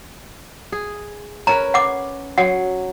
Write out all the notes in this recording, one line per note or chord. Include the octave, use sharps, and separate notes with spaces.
G#4
C#4 A#4 B4 A#5
F#5 D6
F#3 F#5